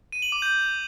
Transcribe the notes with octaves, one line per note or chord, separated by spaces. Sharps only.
D#7
F#7
D6
G6